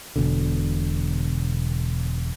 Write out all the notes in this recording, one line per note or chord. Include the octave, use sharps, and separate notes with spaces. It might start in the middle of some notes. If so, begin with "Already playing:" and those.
E1 B2 D3